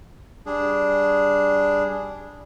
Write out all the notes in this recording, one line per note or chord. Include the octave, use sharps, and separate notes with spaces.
G3 D4 G#4